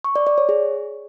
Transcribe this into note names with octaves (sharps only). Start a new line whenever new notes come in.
C#6
D5
D5
C#5
G#4